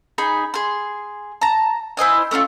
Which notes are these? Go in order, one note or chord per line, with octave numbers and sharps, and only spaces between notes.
D#4 G#4 B5
G#4 C6
A5 A#5
E4 C5 D#5 G#5
A3 C#4 D#4 F4